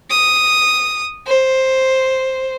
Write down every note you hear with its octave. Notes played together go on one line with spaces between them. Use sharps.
D#6
C5